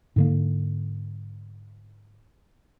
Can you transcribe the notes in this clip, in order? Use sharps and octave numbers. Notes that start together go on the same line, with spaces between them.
G#2 D3 A#3